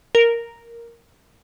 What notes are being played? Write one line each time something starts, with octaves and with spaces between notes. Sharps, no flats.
A#4